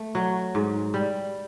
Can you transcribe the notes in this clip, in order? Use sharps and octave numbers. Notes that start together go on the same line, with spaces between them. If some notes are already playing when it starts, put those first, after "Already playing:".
Already playing: A3
F#3
G#2
G3